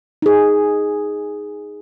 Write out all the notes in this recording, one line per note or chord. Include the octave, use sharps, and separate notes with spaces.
D#4 G#4